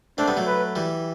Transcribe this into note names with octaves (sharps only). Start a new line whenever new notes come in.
A3 C4 D4
G3 B3
F#3 A3
B4
E3 G3